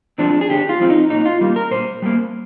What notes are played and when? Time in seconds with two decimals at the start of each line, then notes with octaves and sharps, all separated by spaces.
0.18 F3 G#3 C4 D4
0.41 G#4
0.50 D3 G4
0.69 F4
0.80 F3 G#3 C4
0.90 D#4
1.10 A#2 D#4
1.25 F4
1.41 G3 A#3
1.56 A#4
1.71 A#2 C5
2.02 G3 A#3